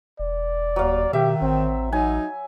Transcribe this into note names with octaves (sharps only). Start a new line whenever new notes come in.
E1 D5
D#2 F#3 F5
B2 D#3 G4 E5
A1 C4
F#3 D#4 G#5